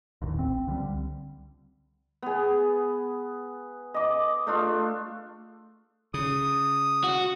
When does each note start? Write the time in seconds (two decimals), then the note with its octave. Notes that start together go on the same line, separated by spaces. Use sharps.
0.22 D1 A1 D#2
0.39 C4
0.67 C#2 D3 E3 G3
2.22 B3 G#4
3.94 D#5 D6
4.47 A3 D4 F4
6.14 C#3 D#6
7.04 F#4